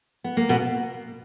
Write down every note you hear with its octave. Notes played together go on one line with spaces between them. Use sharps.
B3
A#3
B2 B3